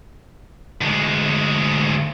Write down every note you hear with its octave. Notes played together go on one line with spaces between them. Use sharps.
D2 G#3